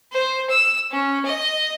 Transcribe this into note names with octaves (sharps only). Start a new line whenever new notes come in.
C5
E6
C#4
D#5